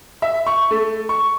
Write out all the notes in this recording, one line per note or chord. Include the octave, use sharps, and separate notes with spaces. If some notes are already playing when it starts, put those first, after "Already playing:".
E5
C#6
A3
C#6